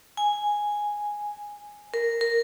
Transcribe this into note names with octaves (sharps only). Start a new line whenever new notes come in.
G#5
A#4
A#4